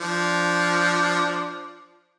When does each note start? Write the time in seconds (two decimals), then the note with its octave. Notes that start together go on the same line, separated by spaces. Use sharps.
0.01 F3 D4